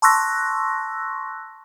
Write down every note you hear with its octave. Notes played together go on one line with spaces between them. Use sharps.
A5 C6 C#6 E6 F#6 A#6